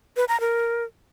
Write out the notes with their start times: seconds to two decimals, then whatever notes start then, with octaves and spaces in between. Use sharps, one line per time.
0.17 B4
0.28 A#5
0.40 A#4